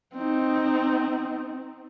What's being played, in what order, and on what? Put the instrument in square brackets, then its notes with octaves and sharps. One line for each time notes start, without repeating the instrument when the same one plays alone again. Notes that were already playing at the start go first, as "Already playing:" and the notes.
[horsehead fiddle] C4 D#4